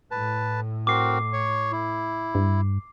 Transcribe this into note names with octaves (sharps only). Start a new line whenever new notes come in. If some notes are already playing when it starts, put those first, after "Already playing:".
A2 B4 A5
C4 F#4 A#4 D6 C7
C#5 C#6
E4
G2